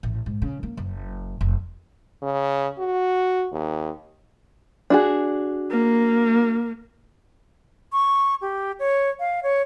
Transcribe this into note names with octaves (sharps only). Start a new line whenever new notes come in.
A1
G#2
C#3
A#3
F#1
F1
C#3
F#4
D#2
D4 F#4 G#4
A#3
C#6
G4
C#5
F5
C#5